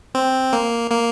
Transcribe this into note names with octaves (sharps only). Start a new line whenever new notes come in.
C4
A#3
A#3